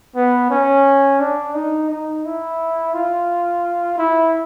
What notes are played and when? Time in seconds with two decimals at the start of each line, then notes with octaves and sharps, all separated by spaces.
0.16 B3
0.51 C#4
1.20 D4
1.55 D#4
1.90 D#4
2.25 E4
2.94 F4
3.98 E4